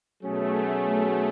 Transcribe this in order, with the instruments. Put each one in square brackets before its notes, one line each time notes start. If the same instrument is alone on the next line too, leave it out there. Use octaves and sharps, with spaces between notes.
[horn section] B2 F#3 C#4 G#4 [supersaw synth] A3